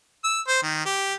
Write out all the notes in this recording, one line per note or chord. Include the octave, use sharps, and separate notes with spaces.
E6
C5
D#3
G4